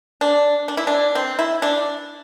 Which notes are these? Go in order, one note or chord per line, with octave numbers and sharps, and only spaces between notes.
D4
D4
E4
D4
C4
E4
D4